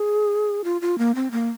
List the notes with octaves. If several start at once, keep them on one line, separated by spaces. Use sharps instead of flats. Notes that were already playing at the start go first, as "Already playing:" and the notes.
Already playing: G#4
F4
F4
A#3
C4
A#3